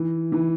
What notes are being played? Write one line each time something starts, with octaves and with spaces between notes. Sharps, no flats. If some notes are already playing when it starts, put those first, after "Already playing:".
Already playing: E3
E3